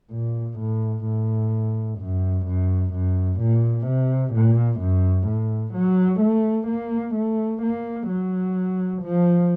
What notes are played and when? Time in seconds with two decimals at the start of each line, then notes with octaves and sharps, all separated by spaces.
0.11 A#2
0.59 A2
1.05 A2
1.99 F#2
2.46 F#2
2.93 F#2
3.39 A#2
3.87 C3
4.34 A#2
4.80 F#2
5.27 A2
5.74 F#3
6.20 A3
6.68 A#3
7.15 A3
7.62 A#3
8.08 F#3
9.02 F3